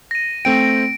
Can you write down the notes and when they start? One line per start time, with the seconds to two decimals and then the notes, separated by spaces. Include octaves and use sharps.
0.11 A#6 D#7
0.45 A3 C4 G5 D7